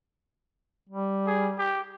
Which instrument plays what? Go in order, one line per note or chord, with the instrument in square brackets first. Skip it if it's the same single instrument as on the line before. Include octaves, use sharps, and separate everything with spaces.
[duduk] G3
[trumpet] G#4
G4